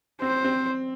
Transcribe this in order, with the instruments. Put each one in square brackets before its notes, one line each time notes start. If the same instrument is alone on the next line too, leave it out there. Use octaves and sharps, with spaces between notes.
[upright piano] C4 [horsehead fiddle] C5
[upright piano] C4